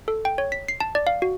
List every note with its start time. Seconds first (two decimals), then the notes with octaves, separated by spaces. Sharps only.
0.08 A4
0.25 G5
0.38 C#5
0.52 B6
0.68 C7
0.80 A5
0.95 D5
1.07 F5
1.22 F#4